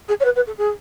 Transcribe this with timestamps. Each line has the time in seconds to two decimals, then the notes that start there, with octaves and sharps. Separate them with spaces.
0.08 G#4
0.20 C#5
0.24 B4
0.35 B4
0.46 A4
0.57 G#4